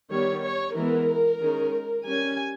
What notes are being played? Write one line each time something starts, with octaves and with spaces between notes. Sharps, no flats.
D#3 G3 B3 C#5
C#5
E3 G#3 B3 A#4
D#3 G#3 C#4
G3 C#4 G#5